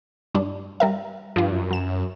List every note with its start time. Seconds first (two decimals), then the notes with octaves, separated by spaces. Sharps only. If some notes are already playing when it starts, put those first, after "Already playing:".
0.34 G2 G3 D4
0.80 G3 A#4 E5
1.36 G2 F3 F4
1.52 F#2
1.71 F#3 E7